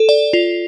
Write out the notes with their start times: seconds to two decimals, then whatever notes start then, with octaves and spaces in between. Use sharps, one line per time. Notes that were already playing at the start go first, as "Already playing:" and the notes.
Already playing: A4
0.09 D5
0.33 F4